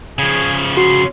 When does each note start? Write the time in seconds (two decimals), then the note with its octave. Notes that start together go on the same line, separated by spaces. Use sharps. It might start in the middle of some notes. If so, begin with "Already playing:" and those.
0.19 C#3 F3 G#4
0.77 F#4 C6